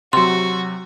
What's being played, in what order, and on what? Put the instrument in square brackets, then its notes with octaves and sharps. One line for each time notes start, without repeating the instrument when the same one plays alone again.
[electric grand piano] C3 F#3 [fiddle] F#4 [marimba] C6